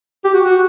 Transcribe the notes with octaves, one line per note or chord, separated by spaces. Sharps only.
G4
F#4
F#4